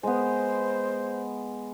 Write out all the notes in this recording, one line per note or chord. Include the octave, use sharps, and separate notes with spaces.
G#3 B3 C5